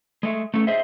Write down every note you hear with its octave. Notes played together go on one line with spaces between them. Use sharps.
G#3 A3
A3 C#4 A4
G#4 C5 D#5 E5